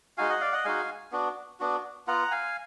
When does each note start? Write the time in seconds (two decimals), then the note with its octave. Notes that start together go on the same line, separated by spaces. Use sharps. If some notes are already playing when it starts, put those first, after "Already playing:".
0.17 G#3 D#4 F#4 F5 G#5
0.29 D#5 F#5
0.41 D5 F5
0.52 D#5 F#5
0.65 G#3 D#4 F#4 F5 G#5
1.12 B3 D4 F#4
1.60 B3 D4 F#4
2.07 B3 F4 F#5 A#5
2.31 F5 G#5